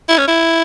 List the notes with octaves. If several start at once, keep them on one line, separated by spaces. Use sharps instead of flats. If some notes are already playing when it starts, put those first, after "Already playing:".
E4
C#4
E4